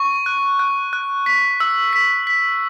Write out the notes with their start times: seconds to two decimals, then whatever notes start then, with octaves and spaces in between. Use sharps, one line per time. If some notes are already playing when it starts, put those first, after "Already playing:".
Already playing: C#6
0.26 F#6
0.59 F#6
0.93 F#6
1.26 B6
1.60 E6
1.93 B6
2.27 B6